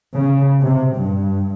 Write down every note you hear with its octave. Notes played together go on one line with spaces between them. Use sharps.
C#3
C3
G2